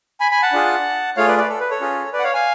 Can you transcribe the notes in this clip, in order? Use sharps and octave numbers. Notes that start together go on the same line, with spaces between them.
G#5 B5
G#5 B5
F#5 A5
D4 F4 G#4
A3 F4 G#4 C#5 F5
B4 D5
B4 D5
A4
B4
A4 C#5
C#4 F4 G#4
B4 D5
F#5
C#5 F5
F5 G#5